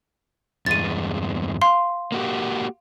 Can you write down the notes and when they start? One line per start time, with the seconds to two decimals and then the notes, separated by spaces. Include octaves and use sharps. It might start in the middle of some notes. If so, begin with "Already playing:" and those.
0.66 E2 G2 G#3 A6 D#7
1.62 F5 C6
2.12 A#3 F#4 G4